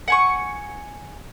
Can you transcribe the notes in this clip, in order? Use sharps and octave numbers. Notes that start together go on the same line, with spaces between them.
F#5 G#5 C#6